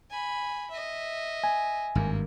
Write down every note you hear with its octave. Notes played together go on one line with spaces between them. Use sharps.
G#5 B5
D#5 E5
G#5
G#1 G2 A#3